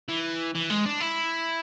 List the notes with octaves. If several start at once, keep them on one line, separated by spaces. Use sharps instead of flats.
E3
E3
G#3
D4
E4